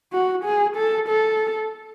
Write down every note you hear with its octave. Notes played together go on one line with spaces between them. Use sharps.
F#4
G#4
A4
A4